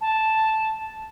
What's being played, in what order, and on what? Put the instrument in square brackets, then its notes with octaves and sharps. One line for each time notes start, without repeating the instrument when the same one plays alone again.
[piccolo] A5